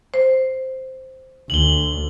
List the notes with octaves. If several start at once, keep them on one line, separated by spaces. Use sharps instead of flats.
C5
D2 F#7 G7